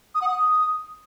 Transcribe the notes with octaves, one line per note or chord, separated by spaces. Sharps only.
D#6
F#5
D#6